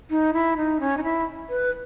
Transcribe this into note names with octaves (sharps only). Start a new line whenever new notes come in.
D#4
E4
D#4
C#4
D#4
E4
B4